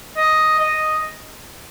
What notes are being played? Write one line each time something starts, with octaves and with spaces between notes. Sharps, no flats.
D#5
D#5